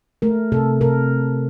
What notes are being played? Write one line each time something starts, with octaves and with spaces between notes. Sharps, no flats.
A3 A#4
C3 A4
C3 A#4